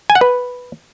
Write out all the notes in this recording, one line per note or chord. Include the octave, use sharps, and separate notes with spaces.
G#5
F#5
B4